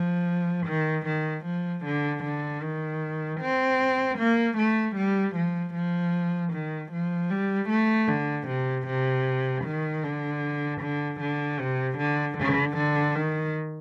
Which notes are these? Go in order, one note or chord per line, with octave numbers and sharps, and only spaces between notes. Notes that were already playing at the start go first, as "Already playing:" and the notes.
Already playing: F3
D#3
D#3
F3
D3
D3
D#3
C4
A#3
A3
G3
F3
F3
D#3
F3
G3
A3
D3
C3
C3
D#3
D3
D3
D3
C3
D3
D3
D3
D#3